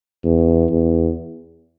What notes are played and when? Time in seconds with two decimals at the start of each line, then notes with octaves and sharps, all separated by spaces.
0.24 E2
0.70 E2